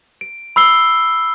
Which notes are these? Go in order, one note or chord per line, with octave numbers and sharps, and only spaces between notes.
D7
B5 E6 C7 G7